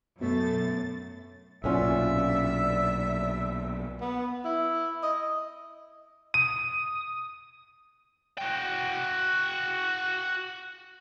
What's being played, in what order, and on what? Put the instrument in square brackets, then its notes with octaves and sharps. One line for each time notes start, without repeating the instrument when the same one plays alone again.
[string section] F#2 A6 [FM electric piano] B2 [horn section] A3
[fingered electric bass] B1 A#2 [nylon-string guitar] F#2 C#4 F4 [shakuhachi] D5 [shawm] E5
[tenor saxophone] B3
E4
D#5
[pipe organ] D#6 [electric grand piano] D#7
[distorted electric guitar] F#4 G5